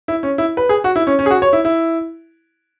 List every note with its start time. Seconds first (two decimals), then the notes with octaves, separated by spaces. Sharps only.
0.08 E4
0.23 C#4
0.38 E4
0.57 B4
0.69 G#4
0.84 F#4
0.96 E4
1.07 C#4
1.19 C#4
1.26 G#4
1.31 F#4
1.42 C#5
1.53 E4
1.65 E4